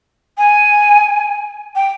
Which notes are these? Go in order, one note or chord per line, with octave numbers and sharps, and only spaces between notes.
G#5
G5